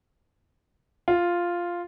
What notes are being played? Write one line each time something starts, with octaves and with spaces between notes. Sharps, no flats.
F4